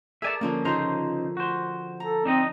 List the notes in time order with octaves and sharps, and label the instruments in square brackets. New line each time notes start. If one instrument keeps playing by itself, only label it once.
[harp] G#4 A#4 D5 [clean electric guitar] E5 G#5 A5
[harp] D3 F3 C#4 [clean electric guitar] A#3 D4
[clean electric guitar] C#3 D#4 C5 [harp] F4 A#5 C6
[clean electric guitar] F#4 C5
[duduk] A4 [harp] A#5
[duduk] C4 [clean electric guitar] D4 D#4 D#5